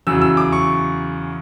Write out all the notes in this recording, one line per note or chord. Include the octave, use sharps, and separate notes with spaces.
E2 C#3 F#3 E6
E6
D6
C#6